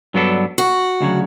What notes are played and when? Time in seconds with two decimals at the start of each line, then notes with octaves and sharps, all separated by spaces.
0.14 G2 F#3 B3 D4 A4
0.58 F#4
1.01 D2 C#3 F#3